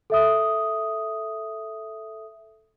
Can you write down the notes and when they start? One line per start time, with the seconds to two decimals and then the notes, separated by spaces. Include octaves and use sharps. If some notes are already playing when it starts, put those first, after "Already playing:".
0.10 A4 E5 D#6